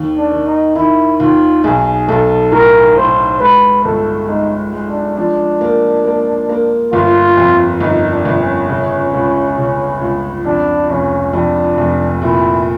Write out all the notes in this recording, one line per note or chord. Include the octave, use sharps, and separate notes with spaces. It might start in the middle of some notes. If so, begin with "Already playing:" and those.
Already playing: D#2
D4
D#3
D#4
D#3 E4
D#2 F4
B1 G#4
B1 A4
A2 A#4
A2 C5
G#3 B4
G1 A4
G#3 D#4
G#3
D4
F3 D4
A#3
A#3
A#3
G1 F4
F2
G1 D#4
D4
G1
C#4
C#3 C#4
C#2
C#3
C#2
F2 D4
F1 C#4
F2 D4
F1
A#2 E4